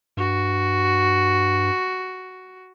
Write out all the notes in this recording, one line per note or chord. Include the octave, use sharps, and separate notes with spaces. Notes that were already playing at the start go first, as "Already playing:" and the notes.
G2 F#4